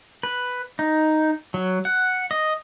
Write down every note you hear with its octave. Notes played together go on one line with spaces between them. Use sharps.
B4
D#4
F#3
F#5
D#5